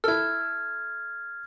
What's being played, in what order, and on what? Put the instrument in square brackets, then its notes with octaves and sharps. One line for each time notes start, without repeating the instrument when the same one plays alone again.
[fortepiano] E4 A4 [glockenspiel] F6 G#6